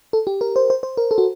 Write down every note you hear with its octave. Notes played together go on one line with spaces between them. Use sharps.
A4
G4
A#4
C5
C5
C5
A#4
A4
F#4